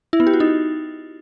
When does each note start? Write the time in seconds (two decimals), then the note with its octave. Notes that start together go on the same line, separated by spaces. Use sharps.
0.13 E4
0.20 B3
0.27 G4
0.33 F#4
0.40 D#4